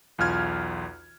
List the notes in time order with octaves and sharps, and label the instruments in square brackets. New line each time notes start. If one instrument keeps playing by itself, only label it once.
[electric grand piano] B1 E2 F4 F6 G#6